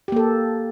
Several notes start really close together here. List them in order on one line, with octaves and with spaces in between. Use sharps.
G4 A#3 A4